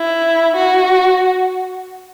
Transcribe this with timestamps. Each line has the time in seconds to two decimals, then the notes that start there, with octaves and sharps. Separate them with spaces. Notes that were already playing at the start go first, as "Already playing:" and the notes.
Already playing: E4
0.57 F#4